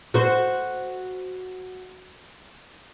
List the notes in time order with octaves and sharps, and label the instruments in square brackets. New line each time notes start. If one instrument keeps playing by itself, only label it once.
[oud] F#4 C5